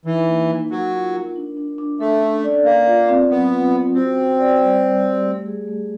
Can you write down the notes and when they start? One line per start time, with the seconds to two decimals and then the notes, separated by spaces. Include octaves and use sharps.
0.05 E3 D#4
0.27 A#3
0.49 D#4
0.70 F#3 A#4
0.92 F4
1.13 A#4
1.36 D4
1.57 D4
1.78 D4
2.00 A3 A4
2.22 C#4
2.44 D5
2.65 A#3 A#4
2.86 F4
3.08 C4
3.30 F#3 B3
3.51 F4
3.73 C#4
3.95 C4 F#4
4.17 F#4
4.38 D5
4.60 G3
4.82 G3
5.03 G4
5.25 A3
5.46 G#4
5.68 A3